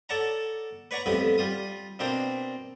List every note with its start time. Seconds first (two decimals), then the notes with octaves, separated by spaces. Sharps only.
0.09 A4 C#5 D5 F#5 A5 A#5
0.91 B4 C#5 D5 F#5 A#5 C#6
1.06 A1 F2 G3 B3 D#5 B5
1.38 G3 F4 D#6
1.99 B2 A#3 C4 D4 G5 A#5